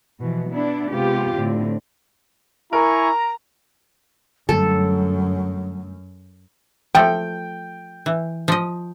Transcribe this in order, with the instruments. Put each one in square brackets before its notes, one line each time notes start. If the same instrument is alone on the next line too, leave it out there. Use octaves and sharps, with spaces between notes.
[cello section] B2 E3 F3
B3 D4 E4
C3 G#3 B3 F4 G4
A2 D3 C4
[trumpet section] E4 G#5 C#6 [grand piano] A#4 [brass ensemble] A#5
[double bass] F#2 [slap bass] D3 G3 A3 [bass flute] F#3 [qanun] A4
[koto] F3 A3 [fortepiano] G5
[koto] E3
F3 D#5